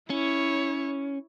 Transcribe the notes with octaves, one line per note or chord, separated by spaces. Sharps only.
C#4 E4 C#5